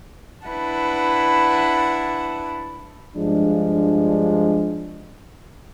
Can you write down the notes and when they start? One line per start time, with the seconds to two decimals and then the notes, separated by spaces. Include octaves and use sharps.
0.48 D4 E4 B4 F#5 A5
3.16 G2 F3 G#3 D4